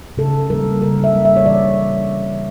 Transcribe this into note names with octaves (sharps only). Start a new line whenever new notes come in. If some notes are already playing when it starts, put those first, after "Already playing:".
C#3 A4
G3 A#3 A#4
C#3 A#4
E5
G3 A#3
E5
C#5
E3 D5